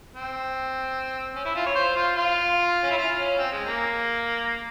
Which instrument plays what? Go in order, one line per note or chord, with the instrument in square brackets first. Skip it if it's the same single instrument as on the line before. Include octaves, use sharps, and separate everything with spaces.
[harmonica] C4
C#4
E4
F4
C#5
C5
F4
F4
C#4
E4
F4
C#4
C4
G#3
A#3